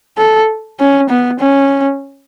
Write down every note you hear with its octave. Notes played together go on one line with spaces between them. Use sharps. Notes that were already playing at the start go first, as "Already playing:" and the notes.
A4
C#4
B3
C#4